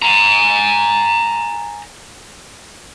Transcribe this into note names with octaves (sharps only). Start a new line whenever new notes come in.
G#5 A#5